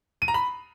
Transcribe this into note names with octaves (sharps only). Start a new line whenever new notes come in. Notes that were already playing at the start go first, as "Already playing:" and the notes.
D#7
A#5
B5